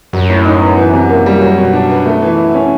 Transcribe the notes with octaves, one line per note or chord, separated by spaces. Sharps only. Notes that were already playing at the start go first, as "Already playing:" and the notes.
F#2 F#3
A2
D#4
B3
E3
C3
A#3
G3
F#3
B2
D4
B3
A3
E3
E4
C#4